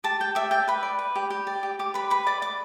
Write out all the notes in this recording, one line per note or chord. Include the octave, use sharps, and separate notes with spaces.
G4 A5
G4 G5
G4 E5
D5 G5
B4 B5
D5
B4
G4
G4
D5
G4
G4 D6
B4 B5
B4 B5
D5 D6
D5 D6